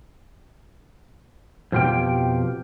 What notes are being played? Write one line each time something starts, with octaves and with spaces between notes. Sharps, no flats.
F2 B2 F4 G4 G5